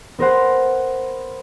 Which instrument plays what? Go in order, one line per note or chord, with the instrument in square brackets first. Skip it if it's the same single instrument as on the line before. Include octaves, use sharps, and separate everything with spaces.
[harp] B3 A#4 C5 F#5